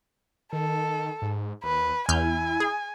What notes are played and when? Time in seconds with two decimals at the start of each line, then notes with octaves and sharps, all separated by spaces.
0.53 D#3 A4
1.22 G#2
1.64 D#2 B4
2.09 E2 E4 G#5 F6 G6
2.60 G#4